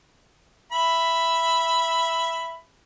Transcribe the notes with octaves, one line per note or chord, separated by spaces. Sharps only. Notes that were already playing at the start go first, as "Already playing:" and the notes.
E5 B5